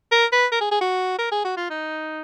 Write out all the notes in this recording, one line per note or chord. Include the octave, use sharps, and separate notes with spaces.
A#4
B4
A#4
G#4
G#4
F#4
A#4
G#4
F#4
F4
D#4